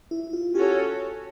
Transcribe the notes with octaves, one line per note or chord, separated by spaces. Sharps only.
E4
F4
C#4 F#4 G4 A4 C#5